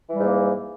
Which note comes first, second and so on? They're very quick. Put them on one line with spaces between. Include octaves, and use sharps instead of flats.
E3 G3 G#2 A#3